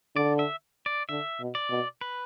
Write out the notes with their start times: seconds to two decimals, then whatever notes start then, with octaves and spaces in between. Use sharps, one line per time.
0.15 D3 D5
0.39 E5
0.86 D5
1.09 D3 E5
1.40 B2
1.55 D5
1.70 B2
2.01 B4